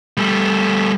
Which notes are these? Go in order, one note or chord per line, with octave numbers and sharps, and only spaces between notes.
G3 A3